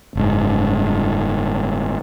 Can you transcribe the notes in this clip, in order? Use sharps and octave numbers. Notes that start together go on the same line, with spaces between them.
F#1 G#2